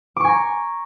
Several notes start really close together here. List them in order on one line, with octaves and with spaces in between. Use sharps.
D6 C#6 G#5 A#5